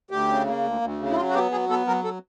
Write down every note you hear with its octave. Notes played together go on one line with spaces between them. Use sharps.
D2 G4
C#3
A#3
D2
D2
C#3
E4
F#3 F4
F#4
B3 G4
F#3 G#4
B3 A4
F#3 A#4
A4